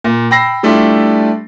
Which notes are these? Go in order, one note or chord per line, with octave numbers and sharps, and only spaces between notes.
A#2
G5 B5 E6 A#6 C7
G3 A3 D4 E4 F4 G4